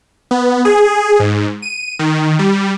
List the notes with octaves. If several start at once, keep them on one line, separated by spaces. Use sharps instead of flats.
B3
G#4
G#2
D#7
D#3
G3